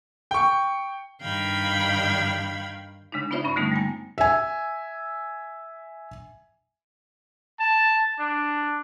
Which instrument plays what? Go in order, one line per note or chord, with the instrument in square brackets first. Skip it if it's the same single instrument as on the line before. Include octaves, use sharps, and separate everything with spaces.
[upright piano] G5 C#6
[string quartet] G2 D#3 F5 G5 B5 G#6
[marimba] C#3 G#3 D4 D#4
B3 D#4 F4 C5 D5 E5
G2 C#4 B5 C#6
D3 G3 A3 B3 D#4
G3 A#3 G#5
[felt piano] E5 G#5
[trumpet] A5
D4